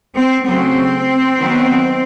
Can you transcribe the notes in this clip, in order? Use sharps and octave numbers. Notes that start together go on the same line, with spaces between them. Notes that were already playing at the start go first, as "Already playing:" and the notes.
C4
C#3 F#3 A3 C4
D#3 F#3 B3